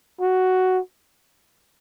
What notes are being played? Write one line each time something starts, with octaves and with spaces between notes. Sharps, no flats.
F#4